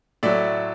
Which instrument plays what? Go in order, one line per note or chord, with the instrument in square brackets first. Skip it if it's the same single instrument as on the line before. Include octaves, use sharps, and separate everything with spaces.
[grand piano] A2 F#3 A3 D5 E5